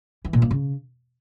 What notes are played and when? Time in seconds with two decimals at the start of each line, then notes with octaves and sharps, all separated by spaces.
0.25 E3
0.33 A#2
0.42 A#3
0.51 C#3